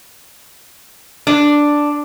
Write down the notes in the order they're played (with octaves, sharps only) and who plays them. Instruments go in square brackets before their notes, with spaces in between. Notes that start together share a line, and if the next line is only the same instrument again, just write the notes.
[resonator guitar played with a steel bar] D4